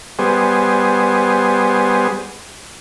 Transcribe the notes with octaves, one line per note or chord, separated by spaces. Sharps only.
G3 B3 G#4 C5